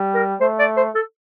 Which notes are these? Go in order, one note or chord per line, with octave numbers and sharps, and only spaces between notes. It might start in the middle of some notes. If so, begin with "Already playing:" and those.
Already playing: G3
A#4
A3 C5
D5
C5
A4